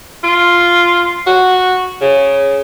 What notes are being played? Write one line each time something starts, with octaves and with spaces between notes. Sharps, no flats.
F4
F#4
C#3